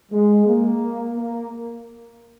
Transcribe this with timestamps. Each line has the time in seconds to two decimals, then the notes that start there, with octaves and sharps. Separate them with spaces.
0.11 G#3
0.46 A#3
1.16 A#3